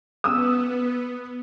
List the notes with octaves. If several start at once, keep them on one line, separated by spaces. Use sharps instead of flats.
B3 D#6 E6